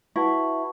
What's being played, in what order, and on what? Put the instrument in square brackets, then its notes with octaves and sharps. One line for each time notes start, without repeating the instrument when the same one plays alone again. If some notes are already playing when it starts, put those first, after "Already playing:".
[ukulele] E4 [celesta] F#4 B4 F#5 A5 C#6